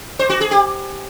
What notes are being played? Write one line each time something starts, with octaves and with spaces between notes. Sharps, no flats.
C5
F#4
G#4
G4